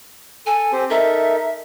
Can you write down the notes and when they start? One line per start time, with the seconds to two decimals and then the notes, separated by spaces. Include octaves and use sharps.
0.46 A4 G#5
0.73 C4 G4 C5
0.90 D#4 A4 A#4 E5